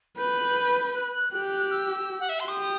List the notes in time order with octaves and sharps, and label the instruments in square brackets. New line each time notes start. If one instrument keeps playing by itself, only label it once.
[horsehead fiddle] B4 [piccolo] G6
[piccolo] F#6
[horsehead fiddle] G4 [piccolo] F#6
[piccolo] F#6
E6
F#5
E5
C6
[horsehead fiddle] G4 [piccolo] D#6